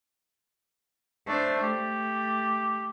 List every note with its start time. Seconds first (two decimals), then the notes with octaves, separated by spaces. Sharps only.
1.28 A3 D4 C5
1.62 A3 G4